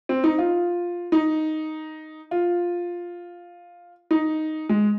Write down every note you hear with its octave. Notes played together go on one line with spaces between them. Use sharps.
C4
D#4
F4
D#4
F4
D#4
G#3